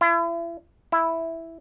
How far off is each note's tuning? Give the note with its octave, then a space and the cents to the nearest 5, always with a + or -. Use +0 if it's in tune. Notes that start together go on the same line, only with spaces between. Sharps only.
E4 +40
E4 +0